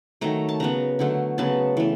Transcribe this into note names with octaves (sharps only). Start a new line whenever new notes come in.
D#3 F#3 A3 A#5
A5
C#3 F#3 B3 A#5
D3 F#3 A3
C#3 F#3 B3 A5
E3 A3